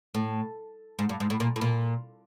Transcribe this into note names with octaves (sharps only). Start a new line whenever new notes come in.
A2
G#2
G2
G#2
A2
A#2
A2
A#2